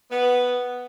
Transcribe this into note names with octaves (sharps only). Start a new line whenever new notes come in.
B3